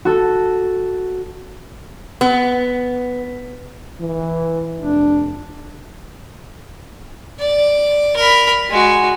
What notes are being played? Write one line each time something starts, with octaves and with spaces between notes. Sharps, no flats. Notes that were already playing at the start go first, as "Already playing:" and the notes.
F#4 A4
B3
E3
F1 D4
D5
A#4 B5
G#3 F#4